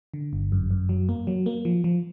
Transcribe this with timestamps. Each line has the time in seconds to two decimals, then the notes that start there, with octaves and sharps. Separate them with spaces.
0.14 D3
0.33 G1
0.52 F#2
0.71 F#2
0.89 F#3
1.09 A#3
1.27 F#3
1.46 A#3
1.65 F3
1.84 F3